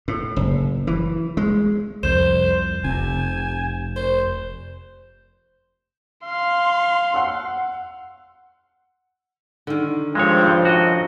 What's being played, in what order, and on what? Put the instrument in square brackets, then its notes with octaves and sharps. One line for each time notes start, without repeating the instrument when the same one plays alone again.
[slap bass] A2
F#1
E3
G#3
[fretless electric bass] C2 F2 [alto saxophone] C5 [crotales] G6 E7
[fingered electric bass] F1 [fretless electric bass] C3 [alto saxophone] G#5
[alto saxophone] C5
[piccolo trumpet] F5 [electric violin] C6
[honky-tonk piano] F#5 E6
[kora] D3 D#3
[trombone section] G2 C4 [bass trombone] F3 [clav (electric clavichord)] G#3 C#5
[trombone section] F#2 D#4 [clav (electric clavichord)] F#4 D#5